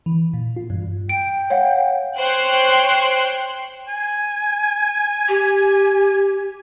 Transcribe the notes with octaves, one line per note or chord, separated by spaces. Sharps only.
E3
A#2
F4
G2
G5 D7
C#5 F5 F#5
C5 C#5 G5 C6 F#6
G#5
G4